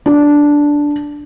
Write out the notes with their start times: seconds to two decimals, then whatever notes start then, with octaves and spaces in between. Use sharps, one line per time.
0.06 D4